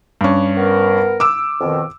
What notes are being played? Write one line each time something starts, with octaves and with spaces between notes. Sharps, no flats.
G2 C#4
B3 A#4
D6 E6
F2 B2 D#3